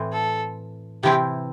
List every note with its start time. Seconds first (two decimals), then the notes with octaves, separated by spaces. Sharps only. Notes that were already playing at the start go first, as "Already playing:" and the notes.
Already playing: A2 E3 C4
0.13 A4
1.03 C3 E3 C4 E4 G4